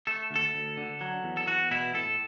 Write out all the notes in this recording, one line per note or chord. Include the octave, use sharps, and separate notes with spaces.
A3 A4
D2 A4
D2
D3
F#3
E2
A4
E2 F#4
B2 E4
A2 A4